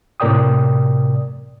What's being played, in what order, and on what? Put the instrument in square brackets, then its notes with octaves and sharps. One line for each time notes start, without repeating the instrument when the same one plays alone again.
[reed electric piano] A2 C3 A#4 D5 G5 D#6